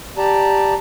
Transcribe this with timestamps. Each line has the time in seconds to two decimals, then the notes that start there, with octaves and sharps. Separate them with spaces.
0.17 G4 D5 A5 A#5